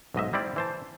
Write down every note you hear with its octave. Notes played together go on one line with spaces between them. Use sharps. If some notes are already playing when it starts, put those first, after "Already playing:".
B1 G#2 D#5 E5
G3 C4 E4 D5
E3 C5 A5